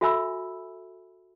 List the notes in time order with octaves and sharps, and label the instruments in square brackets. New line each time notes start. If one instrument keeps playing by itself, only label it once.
[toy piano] F#4 A4 E5 G#5 B5 E6